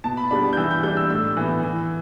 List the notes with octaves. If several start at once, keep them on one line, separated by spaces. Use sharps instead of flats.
B2 A5
B5
G3 B3 D4 B5
G6
E3 E6
G6
G3 D4 G6
E6
A2 E6
E3 B3
E3